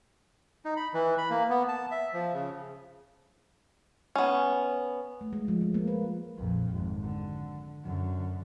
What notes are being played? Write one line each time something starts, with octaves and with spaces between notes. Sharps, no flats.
D#4
B5
E3
B5
A#3
B3
A5
E5
F3
C#3
B3 C#4
A3
G#3
F3
G#3
A#3
B4
A#1 F2
G#1
D3
F#2 D3